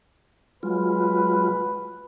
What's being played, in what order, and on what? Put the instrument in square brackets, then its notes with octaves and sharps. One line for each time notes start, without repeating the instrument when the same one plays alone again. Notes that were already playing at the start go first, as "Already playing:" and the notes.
[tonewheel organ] F#3 G#3 F4 [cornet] B4